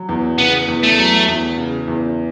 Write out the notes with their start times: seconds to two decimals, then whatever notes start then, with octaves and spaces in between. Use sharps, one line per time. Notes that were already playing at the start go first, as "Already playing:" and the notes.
Already playing: F#3
0.09 E2
0.38 C#3 B3
0.68 E2
0.83 A3
0.98 F#3
1.28 E2
1.58 C#3
1.88 E2